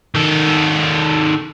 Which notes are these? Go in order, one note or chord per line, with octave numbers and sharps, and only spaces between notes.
D#3 A4